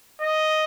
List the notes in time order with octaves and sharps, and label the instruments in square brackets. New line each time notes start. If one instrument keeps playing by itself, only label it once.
[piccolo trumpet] D#5